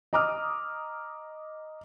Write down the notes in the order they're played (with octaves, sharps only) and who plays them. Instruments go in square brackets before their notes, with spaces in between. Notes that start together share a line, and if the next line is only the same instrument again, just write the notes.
[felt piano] D#5 A#5 D6 D#6 F6